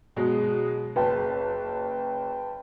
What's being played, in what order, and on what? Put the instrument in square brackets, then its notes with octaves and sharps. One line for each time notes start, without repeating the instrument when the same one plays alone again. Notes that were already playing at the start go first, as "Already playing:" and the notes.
[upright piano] B2 F#3 G#3
[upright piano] F#1 [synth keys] B4 G5 A5